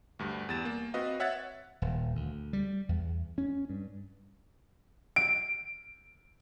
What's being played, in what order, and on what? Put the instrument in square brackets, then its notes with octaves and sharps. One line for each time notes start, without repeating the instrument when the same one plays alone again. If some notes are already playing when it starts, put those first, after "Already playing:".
[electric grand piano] D2 G2
E2 G3 A6 E7
A#3
C4 F#4 B4 D#5 F5
C#5 E5 F#5 F#6 G#6 A6
[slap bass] D#1
D2
G3
E2
C#4
G2
[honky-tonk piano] D7